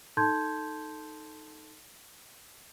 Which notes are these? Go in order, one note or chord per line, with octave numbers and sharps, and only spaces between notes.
D#4 A4 A5 C6 G6 G#6